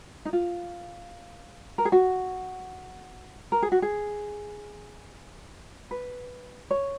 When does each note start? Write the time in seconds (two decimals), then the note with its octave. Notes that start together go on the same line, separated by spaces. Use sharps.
0.25 D#4
0.33 F4
1.78 A#4
1.85 G#4
1.92 F#4
3.52 A#4
3.62 G#4
3.72 F#4
3.82 G#4
5.91 B4
6.71 C#5